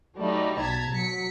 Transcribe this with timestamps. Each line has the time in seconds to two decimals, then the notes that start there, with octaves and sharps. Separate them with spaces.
0.17 F#3 G3 A3 D#4
0.57 B1 A5 A#5 G#6 B6
0.91 F#3 B6 C#7